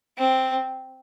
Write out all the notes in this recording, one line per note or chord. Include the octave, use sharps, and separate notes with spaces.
C4